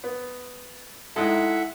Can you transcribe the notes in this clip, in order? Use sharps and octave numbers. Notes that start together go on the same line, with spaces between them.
B3
G#3 D#4 E4 A4 E5 F#5